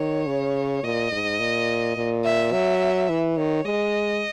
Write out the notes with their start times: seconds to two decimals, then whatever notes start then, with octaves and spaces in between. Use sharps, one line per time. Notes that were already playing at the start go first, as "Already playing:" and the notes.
Already playing: D#3 C#5
0.26 C#3
0.83 A#2 D#5
1.11 G#2
1.39 A#2
1.96 A#2
2.24 E5
2.52 F#3 E5
3.09 E3
3.36 D#3 C#5
3.65 G#3 D#5